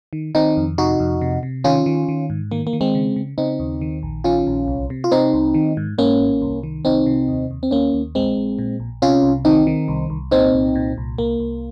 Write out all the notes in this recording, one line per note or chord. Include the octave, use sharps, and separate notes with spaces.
D#3
D#3 C4 D#4
F2
C3 D#4 F#4
F2
C3
C3
D#3 C#4 F4
D#3
D#3
G#2
D#3 A#3
A#3
D#3
G#3 C4
C#3
C#3
C#3 C4 D#4
D#2
D#3
A#1
D#3 C#4 F4
A#1
C2
C3
F4
C3 C4 D#4
C2
D#3
G#2
G#2 A#3 C#4
G#1
C2
D#3
C2 C4 D#4
C3
D#2
D#2
C4
D#2 A#3 C#4
D#2
A#1 G#3 C4
A#1
A#2
A#1
C3 C#4 F4
C2
D#3 C4 D#4
D#3
C2
C2
A#2 C4 D#4
C2
A#2
C2
C2 A#3
C2